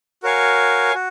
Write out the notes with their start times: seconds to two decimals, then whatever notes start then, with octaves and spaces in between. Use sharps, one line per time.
0.23 F#4 A#4 C#5 F5 G#5
0.94 F#4